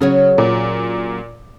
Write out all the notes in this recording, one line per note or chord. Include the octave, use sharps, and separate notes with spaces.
C#3 F#3 C#4 G#4 C#5
A#2